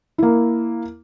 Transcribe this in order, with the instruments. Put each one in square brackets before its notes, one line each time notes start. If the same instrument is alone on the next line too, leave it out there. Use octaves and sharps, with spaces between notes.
[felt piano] A#3 E4